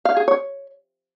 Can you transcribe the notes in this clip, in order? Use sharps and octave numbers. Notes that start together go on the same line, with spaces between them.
F5
G#4
C#5